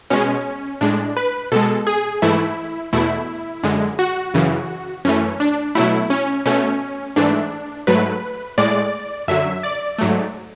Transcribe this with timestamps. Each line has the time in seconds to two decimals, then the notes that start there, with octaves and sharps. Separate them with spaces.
0.10 B2 G#3 C#4
0.81 A2 G#3 D4
1.17 B4
1.52 B2 G#3 A4
1.87 G#4
2.22 G#2 E3 A3 E4
2.93 E2 B2 A3 E4
3.63 F#2 D3 G#3
3.99 F#4
4.34 F#2 C#3 E3
5.05 F#2 E3 A3 C#4
5.40 D4
5.75 B2 F#3 A3 E4
6.10 C#4
6.46 B2 A3 C#4
7.16 G#2 E3 A3 D4
7.87 G#2 F#3 A3 B4
8.58 A2 G#3 D5
9.28 F#2 D3 F#3 E5
9.63 D5
9.98 G#2 F#3 A3